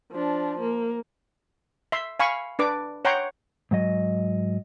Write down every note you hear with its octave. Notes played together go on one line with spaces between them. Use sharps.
F3 D4
A#3
E5 C6
F5 G#5 B5 C#6
D4 B4 D6
C#5 F#5 G5 A#5 C6 C#6
G#2 F#3 D#5